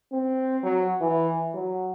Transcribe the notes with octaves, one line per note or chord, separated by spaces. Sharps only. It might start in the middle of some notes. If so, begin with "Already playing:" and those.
C4
F#3
E3
F#3